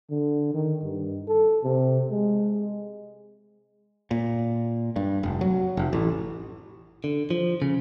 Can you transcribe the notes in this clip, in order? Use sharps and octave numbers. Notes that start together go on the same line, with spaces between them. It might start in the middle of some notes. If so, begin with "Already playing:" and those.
D3
D#3
G2
A4
C3
G#3
A#2
G2
F1
F#3
F1
A1
D3
F3
C#3